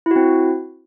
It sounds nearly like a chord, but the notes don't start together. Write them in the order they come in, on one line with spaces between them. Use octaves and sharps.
E4 F#4 C4